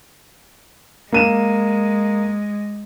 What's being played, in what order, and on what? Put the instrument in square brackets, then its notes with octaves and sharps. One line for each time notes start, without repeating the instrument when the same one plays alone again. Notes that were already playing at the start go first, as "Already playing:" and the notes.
[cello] G#3 [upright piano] A#3 D#7 E7